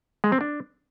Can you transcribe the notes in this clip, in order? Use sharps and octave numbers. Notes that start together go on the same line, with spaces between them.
G#3
C4
D4